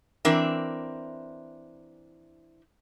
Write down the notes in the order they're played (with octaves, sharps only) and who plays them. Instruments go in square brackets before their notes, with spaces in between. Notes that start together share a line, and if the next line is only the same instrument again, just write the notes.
[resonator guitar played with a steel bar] E3 C4 D4 A#4 E5